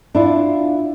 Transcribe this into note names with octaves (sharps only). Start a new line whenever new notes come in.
D4 E4 F4